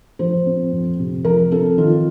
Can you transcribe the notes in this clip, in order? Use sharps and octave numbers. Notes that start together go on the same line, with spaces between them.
F3 C5
C4
F2
C3
F3 A#4
C4 A4
D#3 F4